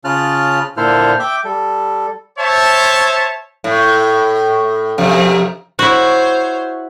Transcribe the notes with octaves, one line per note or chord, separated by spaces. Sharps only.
C#3 C#4 F4 A5 F6 F#6
A#2 D3 E4 A4 C5 F6
E5 G5 D6
G3 A4
C5 C#5 E5 A5
A2
F2 C3
E4 F#4 C5 C#5